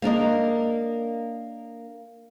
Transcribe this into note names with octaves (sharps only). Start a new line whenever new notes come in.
A#3 D4 A#4 D#5